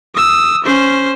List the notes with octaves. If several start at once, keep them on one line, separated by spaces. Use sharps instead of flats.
D#6 E6
C#4 C5